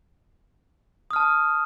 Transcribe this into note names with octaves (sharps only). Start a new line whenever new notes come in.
A5 D#6 F6